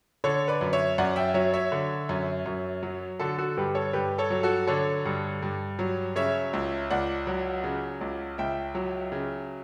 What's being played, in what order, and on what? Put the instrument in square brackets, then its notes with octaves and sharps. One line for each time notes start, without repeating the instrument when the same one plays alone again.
[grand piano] D3 A4 C#5
B4 D5
F#2
C#5 E5
F#2 D5 F#5
E5 G5
F#3 C#5 E5
C#5 E5
D3
F#2
F#2
F#3
D3 F#4 A4
F#4 A4
G2 G4 B4
A4 C#5
G2 G4 B4
A4 C#5
F#3
F#4 A4
D3 A4 C#5
G2
G2
F#3
C#3 C#5 E5
C#2
C#2 D5 F#5
F#3
C#3
C#2
C#2 E5 G5
F#3
C#3